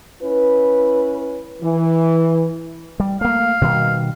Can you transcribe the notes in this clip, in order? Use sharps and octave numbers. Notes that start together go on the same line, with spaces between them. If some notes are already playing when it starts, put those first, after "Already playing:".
C#4 E4 B4
E3
G3
A3 A#3 F5
B2 D#3 G3